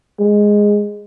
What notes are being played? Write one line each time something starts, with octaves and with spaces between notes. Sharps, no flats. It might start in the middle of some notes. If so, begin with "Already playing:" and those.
G#3